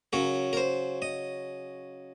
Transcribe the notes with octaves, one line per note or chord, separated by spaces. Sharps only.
C#3 F#3 A#4
A#4
C5
D#5